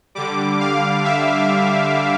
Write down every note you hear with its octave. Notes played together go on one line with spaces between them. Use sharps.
D3 G3 D6
F5
E5